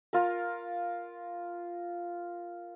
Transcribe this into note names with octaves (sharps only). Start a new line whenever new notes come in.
F4 A#4